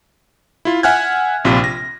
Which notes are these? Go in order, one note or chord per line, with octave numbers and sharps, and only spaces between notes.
E4 F4
E5 F#5 G#5 F6 F#6 G#6
A#1 C3 F4
A#6